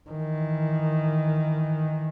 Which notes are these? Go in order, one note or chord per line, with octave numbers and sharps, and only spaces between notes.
D#3 E3